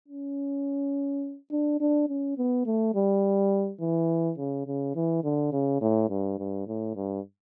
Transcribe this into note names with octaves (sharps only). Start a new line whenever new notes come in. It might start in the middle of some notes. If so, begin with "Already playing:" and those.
C#4
D4
D4
C#4
B3
A3
G3
E3
C#3
C#3
E3
D3
C#3
A2
G2
G2
A2
G2